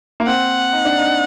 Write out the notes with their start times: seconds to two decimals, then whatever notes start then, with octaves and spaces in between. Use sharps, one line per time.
0.20 A#3
0.27 C4 F#5
0.73 D#4
0.85 D4
0.98 D#4